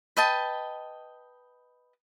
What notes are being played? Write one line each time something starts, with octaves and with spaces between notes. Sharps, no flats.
B4 D#5 G5 A5